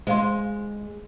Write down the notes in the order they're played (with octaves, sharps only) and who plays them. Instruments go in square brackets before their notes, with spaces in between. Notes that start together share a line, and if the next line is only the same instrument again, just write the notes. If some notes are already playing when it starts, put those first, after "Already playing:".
[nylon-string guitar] G#3 [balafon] C5 F5 C6